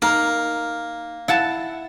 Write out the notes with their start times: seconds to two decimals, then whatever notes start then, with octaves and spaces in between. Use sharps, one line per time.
0.02 A#3 D#4 A#4
1.28 E4 F5 F#5 A5